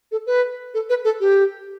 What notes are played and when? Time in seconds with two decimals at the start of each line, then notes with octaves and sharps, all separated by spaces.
0.12 A4
0.26 B4
0.74 A4
0.89 B4
1.04 A4
1.20 G4